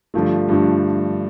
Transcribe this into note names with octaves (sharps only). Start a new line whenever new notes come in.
G2 D3 F3 A3
G2 D3 F3 A3